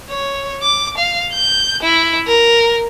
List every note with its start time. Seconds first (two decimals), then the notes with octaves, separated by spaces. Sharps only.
0.10 C#5
0.62 D6
0.98 F5
1.33 G6
1.83 E4
2.27 A#4